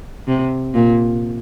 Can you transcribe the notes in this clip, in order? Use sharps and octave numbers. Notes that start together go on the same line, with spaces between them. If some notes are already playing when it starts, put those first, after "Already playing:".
C3
A#2